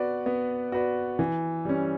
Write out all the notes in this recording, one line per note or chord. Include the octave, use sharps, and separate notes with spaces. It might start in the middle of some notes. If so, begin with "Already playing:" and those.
Already playing: B3 F#4 B4 D5
B3
F#4 B4 D5
E3
G3 C#4